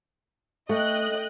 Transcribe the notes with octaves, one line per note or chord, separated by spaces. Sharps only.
A3 D#5 G5 F#6